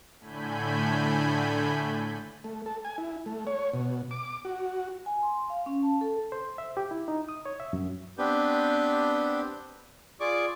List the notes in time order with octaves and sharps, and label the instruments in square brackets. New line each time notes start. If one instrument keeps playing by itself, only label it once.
[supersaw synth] A2 D3 A3 G#5 B5 G6
[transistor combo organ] A3
A4
G#5
E4
A3
C#5
B2
D6
F#4
[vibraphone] G#5
C6
F5
C#4
A5
A4
[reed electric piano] C5
E5
G4
E4
D#4
D#6
C#5
E5
F#2
[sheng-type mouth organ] B3 C4 D4 G4 B4 G6
F4 G#4 D5 C#6 D6